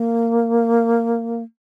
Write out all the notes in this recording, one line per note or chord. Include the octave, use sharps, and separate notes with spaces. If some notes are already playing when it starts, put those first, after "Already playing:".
Already playing: A#3